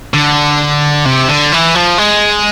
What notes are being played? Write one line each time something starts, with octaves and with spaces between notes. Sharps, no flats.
D3
C3
D3
E3
F3
G#3